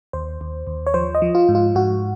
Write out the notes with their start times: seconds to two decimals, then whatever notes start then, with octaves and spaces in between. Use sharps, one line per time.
0.13 D#2 C5
0.41 D#2
0.67 D#2
0.87 C#5
0.94 F3 C5
1.15 D#5
1.22 F3
1.35 F4
1.49 G#2
1.55 F4
1.75 G#2 F#4